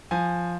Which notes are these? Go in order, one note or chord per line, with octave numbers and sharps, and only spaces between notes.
F3 G#5